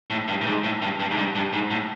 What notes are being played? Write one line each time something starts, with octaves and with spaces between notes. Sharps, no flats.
A2
G2
A2
G#2
A2
G2
G2
G#2
G2
G2
G#2
A2